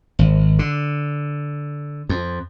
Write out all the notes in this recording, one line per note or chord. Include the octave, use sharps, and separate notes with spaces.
G#1
D3
F2